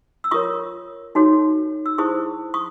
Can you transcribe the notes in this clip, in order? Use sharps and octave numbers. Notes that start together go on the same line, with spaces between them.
E6
F4 A#4 C#5 C#6 D#6
D#4 F#4 A4 C#5
E6
E4 G#4 C5 C#6 D#6
C#6 D#6